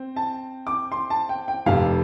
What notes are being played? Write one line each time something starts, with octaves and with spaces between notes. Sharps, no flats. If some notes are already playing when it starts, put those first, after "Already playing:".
Already playing: C4
A5
D6
C6
A5
G5
G5
F1 F2 C3 F5